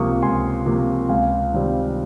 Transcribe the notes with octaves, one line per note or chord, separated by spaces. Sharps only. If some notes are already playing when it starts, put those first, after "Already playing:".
Already playing: C#2 C3 F3 A#3 C#6 D#6
C#2 G#5 C6
C3 F3 A#3
C#2 F5 G#5
C3 D#3 G3 C4